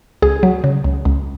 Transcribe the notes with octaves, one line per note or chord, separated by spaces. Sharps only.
C#2 G#4
F#3
C#3
C#2
C#2